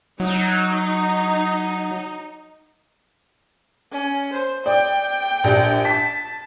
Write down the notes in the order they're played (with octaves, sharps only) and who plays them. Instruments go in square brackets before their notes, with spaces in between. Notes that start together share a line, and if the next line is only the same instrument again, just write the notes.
[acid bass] F#3 [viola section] D#4
[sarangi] C#4
C5
[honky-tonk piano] D5 [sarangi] G5
[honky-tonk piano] A#1 D4 G4
[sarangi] A5 [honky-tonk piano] B6